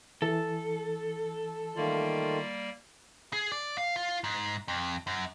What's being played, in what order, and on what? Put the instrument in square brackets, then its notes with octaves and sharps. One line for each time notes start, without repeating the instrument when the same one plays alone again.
[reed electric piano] E3 [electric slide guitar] A4
[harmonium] D#3 A3 F4 [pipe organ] G3 A#3 D5
[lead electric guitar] G#4
D5
F5
F4
G#2
F2
F#2